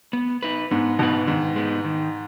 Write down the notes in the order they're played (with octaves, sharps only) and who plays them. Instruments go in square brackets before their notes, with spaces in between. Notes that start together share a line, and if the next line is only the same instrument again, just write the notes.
[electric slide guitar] B3
D#4 B4
[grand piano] G#2 [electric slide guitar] B3
[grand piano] B2 [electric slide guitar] D#4
[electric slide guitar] B4
[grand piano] G#2 [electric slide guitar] D#3
[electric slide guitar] G#3 B3 D#4
D#3